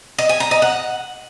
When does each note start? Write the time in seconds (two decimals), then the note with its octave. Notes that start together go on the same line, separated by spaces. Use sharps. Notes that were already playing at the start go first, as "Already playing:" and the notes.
0.19 D#5
0.29 G#5
0.40 A#5
0.51 D#5
0.62 F#5